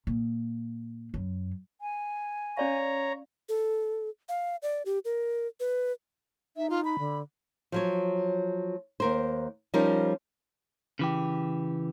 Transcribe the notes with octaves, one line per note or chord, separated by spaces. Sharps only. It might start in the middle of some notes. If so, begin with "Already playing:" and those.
A#2
F#2
G#5
C#4 C#5 D5 F5 A#5
A4
F5
D5
G4
A#4
B4
D#4 E5
F4
B5
D3
F3 F#3 C#5
D#2 A#4 C5
F3 G3 C#4 D#4 A#4
C#3 E3 G4